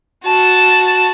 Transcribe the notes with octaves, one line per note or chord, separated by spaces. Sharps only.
F#4 A5